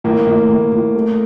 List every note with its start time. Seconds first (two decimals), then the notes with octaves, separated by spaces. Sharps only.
0.04 A2 A#3
0.27 A2
0.49 A2
0.72 A2
0.95 A3